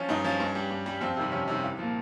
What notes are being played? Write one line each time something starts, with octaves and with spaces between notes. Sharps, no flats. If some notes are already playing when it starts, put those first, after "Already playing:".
Already playing: F3 C#4
G2 D#4
F3 C#4
G2
G3
G2
G3
F2 C4
C3 D#3 G3
F2 C#4
C3 D#3 G3
C2
A#2 F3